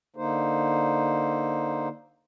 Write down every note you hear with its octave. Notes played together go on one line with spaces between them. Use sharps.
D3 A#3 D#4 C5